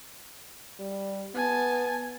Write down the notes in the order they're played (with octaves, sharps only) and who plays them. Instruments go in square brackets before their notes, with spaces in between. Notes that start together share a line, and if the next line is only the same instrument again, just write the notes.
[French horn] G3
[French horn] B3 [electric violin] G#5 A5